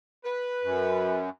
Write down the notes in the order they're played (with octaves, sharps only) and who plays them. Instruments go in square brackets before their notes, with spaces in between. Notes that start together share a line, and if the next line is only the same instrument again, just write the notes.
[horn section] B4
[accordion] F#2